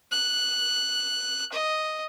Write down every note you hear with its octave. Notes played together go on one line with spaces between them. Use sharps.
F#6
D#5